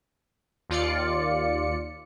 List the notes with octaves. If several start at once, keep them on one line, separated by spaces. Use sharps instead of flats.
D#2 F4 D5 C#7